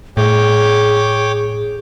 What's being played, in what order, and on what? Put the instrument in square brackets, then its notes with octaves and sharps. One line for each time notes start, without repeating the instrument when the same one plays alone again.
[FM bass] A2 [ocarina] G#4 [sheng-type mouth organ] C#5 G5 D6